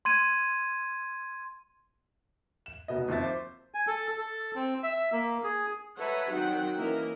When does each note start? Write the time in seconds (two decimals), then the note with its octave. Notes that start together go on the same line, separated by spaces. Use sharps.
0.05 C6 G#6 D#7
2.66 E7
2.88 F1 B2 B3 D#5
3.08 D#2 F3 C4 E5 A6
3.23 C5 D6
3.74 G#5
3.87 A4
4.18 A4
4.56 C4
4.83 E5
5.12 A#3
5.44 G#4
5.98 A4 B4 C#5 E5 F#5 A#5
6.31 D#3 F#3 C4 F#4 F#5 G5
6.75 E3 A#3 C#4 E4 A#4 D#5